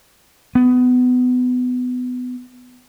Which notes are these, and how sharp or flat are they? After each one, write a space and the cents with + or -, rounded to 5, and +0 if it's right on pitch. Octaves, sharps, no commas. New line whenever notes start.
B3 +20